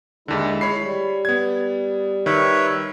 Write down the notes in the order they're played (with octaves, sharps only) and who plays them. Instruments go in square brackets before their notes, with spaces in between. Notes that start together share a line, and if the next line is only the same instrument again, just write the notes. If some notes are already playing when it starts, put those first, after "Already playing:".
[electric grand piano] D#2 D3 [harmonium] G#3 E4
[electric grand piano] C#5 B5 C7
[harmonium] G3
[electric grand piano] B3 G#6
[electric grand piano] D#3 [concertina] B4 C#5 E5